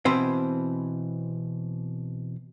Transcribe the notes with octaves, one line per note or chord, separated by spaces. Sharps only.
B2 E3 C4 B4 C5